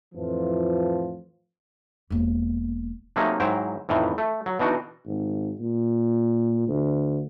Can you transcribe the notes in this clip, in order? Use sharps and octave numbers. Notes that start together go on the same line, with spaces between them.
F2 A2 E3 F3
E1 A#3
C3 F#3 A3 A#3 C#4 D#4
G#2 F#3 E4 C5 G5 A#5
F2 A2 D#3 E3
A3
F#3
B2 E3 D4 D#4 F#4
G#1
A#2
D2